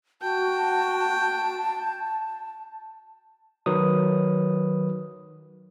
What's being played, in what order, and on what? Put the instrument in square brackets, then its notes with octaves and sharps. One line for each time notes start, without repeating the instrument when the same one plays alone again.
[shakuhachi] F#4 [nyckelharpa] G5 [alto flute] A5
[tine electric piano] D#3 F#3 B4 D#6